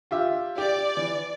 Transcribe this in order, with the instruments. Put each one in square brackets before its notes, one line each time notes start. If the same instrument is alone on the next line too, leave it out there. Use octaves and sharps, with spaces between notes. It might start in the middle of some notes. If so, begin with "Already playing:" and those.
[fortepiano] F4 G4 E5
[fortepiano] G4 [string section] D5
[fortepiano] E3